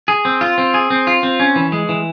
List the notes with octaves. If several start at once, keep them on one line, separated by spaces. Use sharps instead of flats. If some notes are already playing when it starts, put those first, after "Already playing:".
G#4
C4
F4
C4
G#4
C4
F4
C4
C#4
E3
G#3
E3